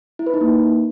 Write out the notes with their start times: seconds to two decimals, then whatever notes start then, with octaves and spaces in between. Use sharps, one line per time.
0.19 E4
0.26 B4
0.34 D#4
0.41 A#3